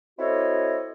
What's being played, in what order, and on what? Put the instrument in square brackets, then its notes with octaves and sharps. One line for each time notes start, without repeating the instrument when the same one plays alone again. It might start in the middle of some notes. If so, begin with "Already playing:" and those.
[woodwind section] C4 E4 F#4 A4 C#5 D#5